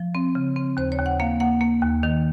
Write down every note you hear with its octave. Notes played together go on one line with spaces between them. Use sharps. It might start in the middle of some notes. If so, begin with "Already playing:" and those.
Already playing: F3
C4
C#3
C4
D#2 C5
C#5
D#2
F#5
A#3 F5
A#3 F#5
A#3
D#2
D#3